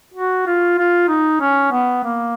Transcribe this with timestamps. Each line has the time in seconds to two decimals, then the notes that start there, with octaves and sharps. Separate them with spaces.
0.14 F#4
0.46 F4
0.78 F4
1.08 D#4
1.41 C#4
1.72 B3
2.04 A#3